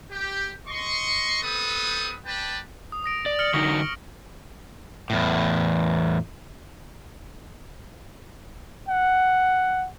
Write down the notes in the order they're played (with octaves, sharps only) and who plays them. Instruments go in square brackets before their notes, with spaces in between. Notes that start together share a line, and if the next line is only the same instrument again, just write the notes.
[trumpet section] G4
D#5 C6 C#6
G3 B3 C4 A4 B4 D#6
G#4 B4 D5 G5 A5
[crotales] D#6
D#6 A#6 D7
[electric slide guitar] D5
[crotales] F6 C#7 F#7
[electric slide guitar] D3 F#3 D#4 [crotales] C#6 A#6 C#7
[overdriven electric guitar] E2 A2
[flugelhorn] F#5